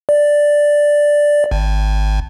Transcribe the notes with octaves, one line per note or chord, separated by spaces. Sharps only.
D5
G#1